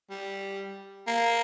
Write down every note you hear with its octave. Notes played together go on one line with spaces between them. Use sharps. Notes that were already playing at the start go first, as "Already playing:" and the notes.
G3
A#3